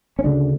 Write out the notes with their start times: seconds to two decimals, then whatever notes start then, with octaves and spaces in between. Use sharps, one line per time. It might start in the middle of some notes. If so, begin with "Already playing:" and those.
0.19 C#4
0.24 D2 C#3 D4